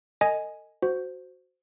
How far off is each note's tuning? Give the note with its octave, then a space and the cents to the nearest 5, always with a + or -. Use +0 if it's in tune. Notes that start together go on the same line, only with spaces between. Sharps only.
A4 +45 D#5 +0 G#5 +0
F#4 +0 C5 -10